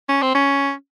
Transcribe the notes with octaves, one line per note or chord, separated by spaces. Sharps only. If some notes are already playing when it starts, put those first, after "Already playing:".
C#4
C4
C#4